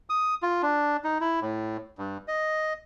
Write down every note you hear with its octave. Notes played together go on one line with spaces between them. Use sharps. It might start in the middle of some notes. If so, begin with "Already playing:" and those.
D#6
F4
D4
D#4
E4
A2
G2
D#5